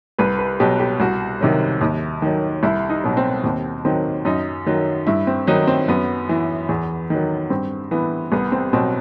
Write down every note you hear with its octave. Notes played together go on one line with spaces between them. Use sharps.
C2 B4
B4
B2 F#3 G4
G4
C2 F#4
C3 D#3 F#3
D#2
D#3 F#3
C2 E4
D#4
B2 F#3
C4
D#2 C4
D#3 F#3 C4
F#2 D#4
D#3 F#3
G2 E4
C4
D#3 F#3 D#4
C4
F#2 B3
E3
E2
D#3 F#3
G2 C4
E3 B3
C2 B3
C4
B2 F#3 C4